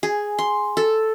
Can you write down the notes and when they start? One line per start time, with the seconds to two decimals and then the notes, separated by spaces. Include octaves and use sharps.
0.03 G#4
0.39 C6
0.77 A4